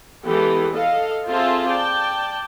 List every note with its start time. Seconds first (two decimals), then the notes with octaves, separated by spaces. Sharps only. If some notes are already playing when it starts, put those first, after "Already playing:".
0.25 E3 G#3 B3 G4 A4
0.72 A4 D#5 F5
1.28 C4 F4 G#4 A4 E5 A5
1.69 D5 G5 A5